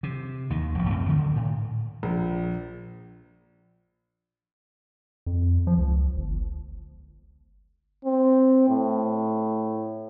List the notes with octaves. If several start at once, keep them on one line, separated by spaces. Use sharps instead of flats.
C3
D#2 D#3
F1 A#1
F#2 A2 C#3 C4
D3 D#3
A2
A#1
F2
F3
C#2
G1
C4
A2